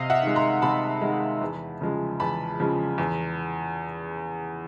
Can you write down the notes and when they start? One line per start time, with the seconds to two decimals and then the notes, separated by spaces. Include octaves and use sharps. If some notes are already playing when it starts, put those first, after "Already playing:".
Already playing: C3 D#5 F5
0.10 E5 F#5
0.23 D#3 G#3
0.36 A#5 C6
0.62 C3 A5 B5
1.01 D#3 G#3
1.41 E2
1.81 C#3 F3 G#3
2.20 E2 A5 B5
2.60 C#3 F3 G#3
2.98 E2